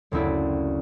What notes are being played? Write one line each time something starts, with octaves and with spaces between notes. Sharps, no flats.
F#1 D2 C4 E4 D5